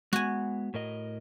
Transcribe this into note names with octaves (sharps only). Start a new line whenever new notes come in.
G#3 B3 F#4 G#5
A2 A#4 D#5